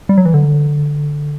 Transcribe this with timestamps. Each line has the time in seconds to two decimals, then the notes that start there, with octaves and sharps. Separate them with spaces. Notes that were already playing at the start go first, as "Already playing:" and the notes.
0.09 G3
0.18 F#3
0.26 E3
0.34 D3